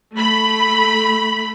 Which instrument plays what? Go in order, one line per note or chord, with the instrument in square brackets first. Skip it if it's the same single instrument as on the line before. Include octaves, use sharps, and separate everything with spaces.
[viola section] A3 B5